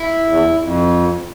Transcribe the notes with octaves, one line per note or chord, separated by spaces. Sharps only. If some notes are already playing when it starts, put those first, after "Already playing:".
Already playing: E4
E2
F2